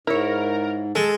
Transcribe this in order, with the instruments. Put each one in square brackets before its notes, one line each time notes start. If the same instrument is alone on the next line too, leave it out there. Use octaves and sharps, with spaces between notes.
[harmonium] G#2 [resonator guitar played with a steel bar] E4 C#5 [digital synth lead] A#4
[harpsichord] G#3 [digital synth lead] A4